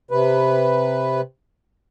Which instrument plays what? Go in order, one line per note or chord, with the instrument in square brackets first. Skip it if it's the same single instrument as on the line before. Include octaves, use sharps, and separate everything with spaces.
[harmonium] C3 B4